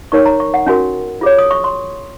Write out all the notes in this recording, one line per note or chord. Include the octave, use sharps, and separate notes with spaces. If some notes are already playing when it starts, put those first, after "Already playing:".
D#4 A#4 C#5 C#6
A#5
C#6
F#5
C#4 F#4 A#4 G#5
F4 G#4 C#5
D#6
C#6
C6